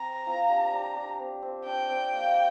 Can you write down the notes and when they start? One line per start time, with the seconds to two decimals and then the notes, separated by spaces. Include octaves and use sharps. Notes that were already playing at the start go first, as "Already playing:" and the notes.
Already playing: C4 A#5
0.26 C4 F4
0.49 D4 G4
0.73 D4 G4
0.96 D4 G4
1.19 C4
1.42 C4
1.66 D4 G5
1.89 C4
2.12 A#3